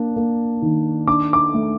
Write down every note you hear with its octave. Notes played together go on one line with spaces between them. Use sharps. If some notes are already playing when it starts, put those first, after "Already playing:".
Already playing: A#3 D4
A#3
D#3
D4 D6
D6
A3